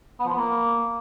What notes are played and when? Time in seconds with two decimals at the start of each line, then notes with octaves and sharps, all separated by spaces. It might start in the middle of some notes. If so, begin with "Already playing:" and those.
0.20 B3
0.25 F3
0.31 B3
0.37 A#3